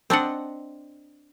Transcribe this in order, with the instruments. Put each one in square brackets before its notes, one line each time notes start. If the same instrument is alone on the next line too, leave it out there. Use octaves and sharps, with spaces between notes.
[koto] C4 D4 D#5 F#5